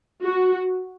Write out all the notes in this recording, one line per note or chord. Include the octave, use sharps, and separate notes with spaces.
F#4